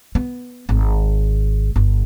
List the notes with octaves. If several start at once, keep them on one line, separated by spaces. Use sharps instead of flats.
B3
G#1
G1